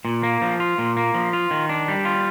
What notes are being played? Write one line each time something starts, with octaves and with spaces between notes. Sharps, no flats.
A#2
A#3
F3
F4
A#2
A#3
F3
F4
D#3
D4
G3
F4